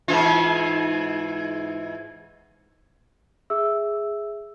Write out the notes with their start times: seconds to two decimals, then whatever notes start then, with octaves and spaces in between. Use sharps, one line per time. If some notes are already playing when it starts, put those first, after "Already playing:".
0.08 G#2 E3 F4
3.50 G#4 E5 E6